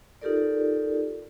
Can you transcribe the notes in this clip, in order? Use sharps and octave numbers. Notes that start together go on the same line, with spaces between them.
D#4 F4 G4 A4 A#4 D5